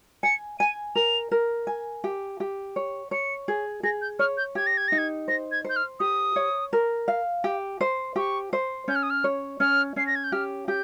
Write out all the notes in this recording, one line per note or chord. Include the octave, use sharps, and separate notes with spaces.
G#5 C#7
G#5 D#7
A#4 F7
A#4
G#5
G4
G4
C#5
C#5 C#7
G#4
G#4 A#6
G6
C#5 F6
G6
G4 G#6
A#6
G#6
D#4 A#6
G#6
C5 A#6
G#6
C5
G6
F6
G4 D#6
C#5
A#4
F5
G4
C5
G4 C#6
C5
C#4 G6
F6
D#6
F6
C#5
C#4 F6
C#4 C7
A#6
G#6
G6
G4 F6
G4 G6